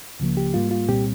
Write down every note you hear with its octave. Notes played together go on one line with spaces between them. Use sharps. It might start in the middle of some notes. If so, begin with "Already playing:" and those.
C#2 C#3 F3 A#3
G4
G#2 G3 A#3 F4
F4
C2 A#2 G3 C4 G4